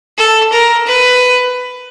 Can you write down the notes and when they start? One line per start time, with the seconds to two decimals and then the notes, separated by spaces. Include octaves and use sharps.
0.18 A4
0.52 A#4
0.87 B4